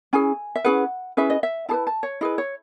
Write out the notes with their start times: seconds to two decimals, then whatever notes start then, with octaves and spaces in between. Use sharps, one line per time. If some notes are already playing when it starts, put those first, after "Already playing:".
0.13 C#4 E4 G#4 G#5
0.55 E5
0.64 C#4 E4 G#4 B4 F#5
1.17 C#4 E4 G#4 B4 E5
1.30 D#5
1.43 E5
1.69 E4 G#4 B4 A5
1.87 A5
2.03 C#5
2.21 E4 G#4 B4 D#5
2.38 C#5